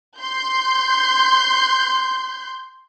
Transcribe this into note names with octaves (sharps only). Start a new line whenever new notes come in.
C6 G6